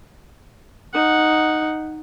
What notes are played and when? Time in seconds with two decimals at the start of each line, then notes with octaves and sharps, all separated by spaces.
0.93 D#4 F#5